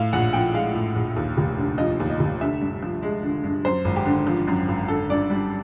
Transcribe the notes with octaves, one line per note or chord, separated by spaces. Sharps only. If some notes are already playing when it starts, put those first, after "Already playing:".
Already playing: A2 F5
A#1 F#5
F3 G5
G#3 F5
A2
A#1
D#2
F1
D3
F3 D#5
D#2
D#5
F1
D3 E5
G2
F3
G#3
D3
G2
F#2 C5
G#1
G4
D3
F3
F#2
G#1
D3 A4
G2 D5
G3